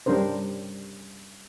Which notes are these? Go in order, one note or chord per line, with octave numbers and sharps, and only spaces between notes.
G3 C#4 D4 A#4 C5